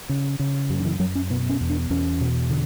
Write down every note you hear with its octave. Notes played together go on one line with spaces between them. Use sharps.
C#3
C#3
F#2 F#3
D3
E3
F#2 F#3
C#4
B2 B3
C#4
E2
D4
E2 C#4
B2
D3